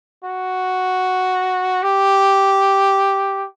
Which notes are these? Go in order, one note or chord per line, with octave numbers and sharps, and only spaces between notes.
F#4
G4